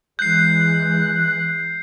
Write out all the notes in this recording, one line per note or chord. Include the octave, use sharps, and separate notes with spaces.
E3 G#3 F#6 G6 C7